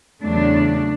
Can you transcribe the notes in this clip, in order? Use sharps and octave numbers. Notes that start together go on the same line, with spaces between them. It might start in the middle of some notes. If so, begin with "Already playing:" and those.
E2 C#3 F#3 A3 D4